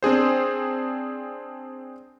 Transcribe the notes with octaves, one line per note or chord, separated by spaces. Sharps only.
C4 D4 G#4 C5